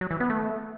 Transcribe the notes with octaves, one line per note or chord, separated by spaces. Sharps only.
F#3
E3
B3
A3